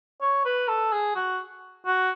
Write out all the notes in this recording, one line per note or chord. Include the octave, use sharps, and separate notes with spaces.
C#5
B4
A4
G#4
F#4
F#4